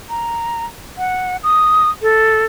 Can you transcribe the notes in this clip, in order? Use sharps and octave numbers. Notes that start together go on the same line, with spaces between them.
A#5
F#5
D#6
A4